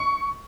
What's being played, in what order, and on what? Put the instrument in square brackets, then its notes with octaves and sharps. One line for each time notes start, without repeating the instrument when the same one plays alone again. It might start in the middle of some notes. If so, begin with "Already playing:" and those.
Already playing: [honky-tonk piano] C#6